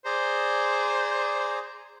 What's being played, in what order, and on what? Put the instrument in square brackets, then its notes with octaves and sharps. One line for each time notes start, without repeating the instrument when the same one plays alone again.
[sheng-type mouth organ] G#4 D5 A#5 [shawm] C5